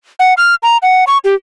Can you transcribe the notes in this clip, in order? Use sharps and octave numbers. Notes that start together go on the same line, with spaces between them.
F#5
F6
A#5
F#5
C#6
G4